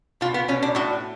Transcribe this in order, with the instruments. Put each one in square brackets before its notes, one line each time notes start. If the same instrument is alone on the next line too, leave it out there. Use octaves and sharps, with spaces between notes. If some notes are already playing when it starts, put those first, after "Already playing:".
[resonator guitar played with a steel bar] B2 F4
B3
B2 C#4
D4
A2 F#4